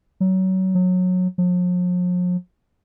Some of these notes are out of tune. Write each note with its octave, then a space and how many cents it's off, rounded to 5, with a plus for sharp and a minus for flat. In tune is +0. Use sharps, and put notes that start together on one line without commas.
F#3 +25
F#3 -20
F3 +45